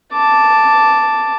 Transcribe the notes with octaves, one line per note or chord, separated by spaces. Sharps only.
A5 D6